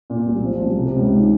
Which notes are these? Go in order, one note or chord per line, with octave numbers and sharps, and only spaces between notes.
A#2
C2
F3
C2
C3
C#2
D#3